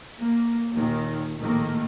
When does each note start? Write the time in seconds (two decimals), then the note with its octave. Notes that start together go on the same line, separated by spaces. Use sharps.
0.21 A#3
0.71 D#2 A#2 D#3
1.39 A#1 A2 D#3 A3 A#3